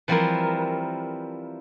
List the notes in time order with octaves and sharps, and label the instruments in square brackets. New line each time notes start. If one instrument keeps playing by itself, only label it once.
[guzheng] E3 F3 G3 C4 E4 A#4